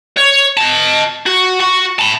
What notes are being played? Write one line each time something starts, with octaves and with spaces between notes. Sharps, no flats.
C#5
D#5 A5
F#4
F#4
A5 B5